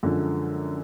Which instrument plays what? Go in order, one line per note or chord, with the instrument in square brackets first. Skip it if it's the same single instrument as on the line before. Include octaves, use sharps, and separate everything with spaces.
[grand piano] F#2 D3 F3 G#3